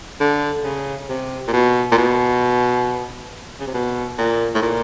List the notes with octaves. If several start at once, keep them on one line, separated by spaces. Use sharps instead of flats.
D3
C#3
C3
A#2
B2
A#2
B2
C#3
C3
B2
A#2
A2
A#2